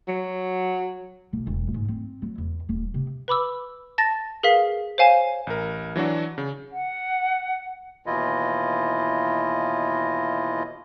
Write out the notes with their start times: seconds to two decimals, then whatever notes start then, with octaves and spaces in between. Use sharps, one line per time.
0.08 F#3
1.33 B1
1.47 E1
1.74 G#2
1.88 C4
2.22 F#3
2.38 E2
2.69 D#1
2.94 C3
3.28 B4 B5 D6 E6
3.98 A5 A6 A#6
4.43 G#4 A#4 B4 F5 B6
4.98 C5 C#5 F5 G#5 E7
5.47 A1 A#4
5.96 E3 F#3 D4 F#4
6.38 C#3
6.72 F#5
8.06 D#2 B2 E3 E4 F4 D#5